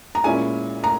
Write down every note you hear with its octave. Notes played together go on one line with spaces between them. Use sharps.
A#5
A#2 G#3 C#4 E4 G#5
A#5